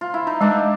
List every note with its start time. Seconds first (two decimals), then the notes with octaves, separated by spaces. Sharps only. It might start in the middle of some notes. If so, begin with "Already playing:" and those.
0.01 F4
0.14 E4
0.27 D#4
0.41 G#3 D4